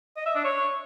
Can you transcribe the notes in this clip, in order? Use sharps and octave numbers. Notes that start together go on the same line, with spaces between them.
D#5
E5
D4
C#5